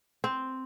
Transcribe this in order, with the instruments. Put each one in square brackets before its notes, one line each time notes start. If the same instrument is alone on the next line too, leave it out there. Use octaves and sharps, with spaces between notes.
[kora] C4